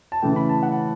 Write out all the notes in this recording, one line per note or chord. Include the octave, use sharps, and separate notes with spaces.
A5
C#3 E3 A3 G5
B5
A5
F#5